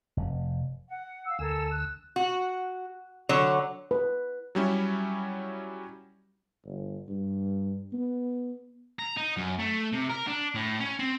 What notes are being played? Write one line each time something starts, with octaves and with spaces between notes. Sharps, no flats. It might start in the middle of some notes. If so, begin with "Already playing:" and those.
F1
F#5
F5 E6
D2 A4 A#4 G#5 E6
F#6
F#4
D3 F#3 C#5
B4
F#3 G3 C#4 E4
G1
G2
B3
A#5
D#4
F#2
A3
C3
A#4
D4
A2
C#4
C4